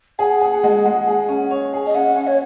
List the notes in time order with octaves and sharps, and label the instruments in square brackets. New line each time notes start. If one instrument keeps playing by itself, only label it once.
[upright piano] G#4 [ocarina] F#5
[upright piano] G#4
G#3
G#3
G#4
C#4
C#5
G#4
[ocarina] D#5
[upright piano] C#4 [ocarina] F#5
[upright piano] C#4
[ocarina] C#5